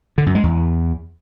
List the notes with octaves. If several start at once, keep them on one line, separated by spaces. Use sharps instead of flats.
D3
F#2
G#3
E2